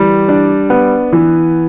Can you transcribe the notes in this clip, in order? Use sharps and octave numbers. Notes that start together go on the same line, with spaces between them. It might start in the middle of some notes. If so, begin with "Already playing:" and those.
Already playing: E3 G3
D4
B3
E3